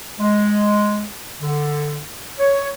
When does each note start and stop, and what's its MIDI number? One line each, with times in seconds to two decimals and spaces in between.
0.20 1.03 56
1.42 2.02 50
2.40 2.69 73